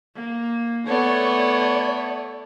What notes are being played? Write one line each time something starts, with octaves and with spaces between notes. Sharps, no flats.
A#3
A3 B3 C#5 D5